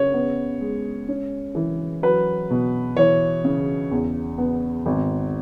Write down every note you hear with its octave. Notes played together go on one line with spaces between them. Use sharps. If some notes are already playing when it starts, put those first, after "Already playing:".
Already playing: C#3 C#5
B3
G#3
C#4
E3
F#3 B4
B2
E3 C#5
C#3
E2
B3
G#1